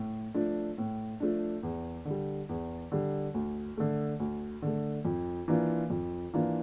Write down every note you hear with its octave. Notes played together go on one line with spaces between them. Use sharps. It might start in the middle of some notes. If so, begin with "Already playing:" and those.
Already playing: A2
F3 A3 D4
A2
F3 A3 D4
E2
D3
G3
E2
D3 G3
D2
D3 A3
D2
D3 A3
F2
E3 A#3 D4 F4
F2
E3 A#3 D4 F4